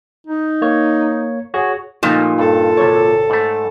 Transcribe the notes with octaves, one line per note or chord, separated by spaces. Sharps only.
D#4
A#3 C#5
F#4 G#4 C#5
A#2 F3 G#3 A3 D#4 G4
G2 A4
G#1 C3 C#5 A5
G#2 A3